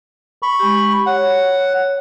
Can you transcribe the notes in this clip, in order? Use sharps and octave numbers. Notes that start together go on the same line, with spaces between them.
B5 C#6
G#3 G4
C#5 F#5